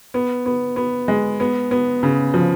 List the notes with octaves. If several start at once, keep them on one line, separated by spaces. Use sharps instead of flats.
B3
B3
B3
G#3
B3
B3
C#3
F3